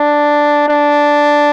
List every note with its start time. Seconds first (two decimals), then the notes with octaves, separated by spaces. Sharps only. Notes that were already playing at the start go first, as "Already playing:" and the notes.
Already playing: D4
0.68 D4